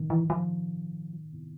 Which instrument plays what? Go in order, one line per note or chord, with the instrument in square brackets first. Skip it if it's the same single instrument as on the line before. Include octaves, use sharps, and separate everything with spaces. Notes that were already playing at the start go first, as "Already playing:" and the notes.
Already playing: [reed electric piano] D#3
[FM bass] E3
F3